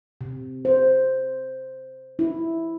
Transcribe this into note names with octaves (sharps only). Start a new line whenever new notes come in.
C3
C5
E4